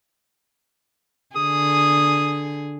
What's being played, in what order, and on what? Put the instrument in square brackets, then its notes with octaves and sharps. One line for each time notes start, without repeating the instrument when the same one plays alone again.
[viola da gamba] D3 G#4 [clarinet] D#6